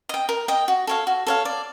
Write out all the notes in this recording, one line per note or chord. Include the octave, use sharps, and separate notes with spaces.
D#5 G5
A#4
D#5 G5
F#4
A4 C#5 F5
F#4
A4 C#5 F5
D5